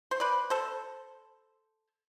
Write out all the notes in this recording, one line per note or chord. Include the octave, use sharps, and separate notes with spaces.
C5
B4 D5
A4 C5